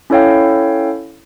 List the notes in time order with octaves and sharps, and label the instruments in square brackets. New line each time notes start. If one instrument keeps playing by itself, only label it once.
[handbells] C#4 E4 A4 C#5 F5 G5